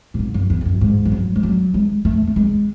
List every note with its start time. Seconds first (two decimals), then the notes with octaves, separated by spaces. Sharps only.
0.14 A2
0.19 G#2
0.34 F#2
0.50 E2
0.61 E2
0.65 F#2
0.81 G#2
1.05 E3
1.12 F#3
1.36 G#3
1.43 F#3
1.74 G#3
2.05 A3
2.27 A3
2.36 G#3